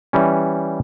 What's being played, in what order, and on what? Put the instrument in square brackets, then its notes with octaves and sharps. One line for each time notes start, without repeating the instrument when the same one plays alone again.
[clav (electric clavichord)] E3 G3 C#4